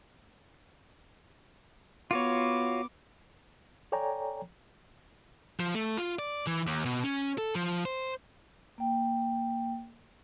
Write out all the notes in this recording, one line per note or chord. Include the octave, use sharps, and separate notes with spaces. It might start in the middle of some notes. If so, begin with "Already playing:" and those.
B3 F4 F#4 C#5 D6
A4 C#5 D5 G5 G#5 A#5
F3
A3
F4
D5
E3
D#2
B2
C#4
A4
F3
C5
A#3 G5